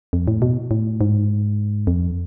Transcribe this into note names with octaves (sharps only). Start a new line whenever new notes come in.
F2
A2
B2
A2
G#2
F2